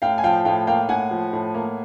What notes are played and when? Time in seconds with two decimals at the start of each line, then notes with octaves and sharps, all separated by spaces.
0.02 A2 F5 G5
0.18 G#5
0.24 F3 F5 G5
0.45 A2 F5 G5
0.67 A#3 F5 G5
0.89 A2 F#5 G#5
1.11 F3
1.33 A2
1.54 A#3